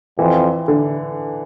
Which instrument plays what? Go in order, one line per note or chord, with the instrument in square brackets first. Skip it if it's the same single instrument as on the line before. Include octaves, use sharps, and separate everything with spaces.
[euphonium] F2 [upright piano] E3
[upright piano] D3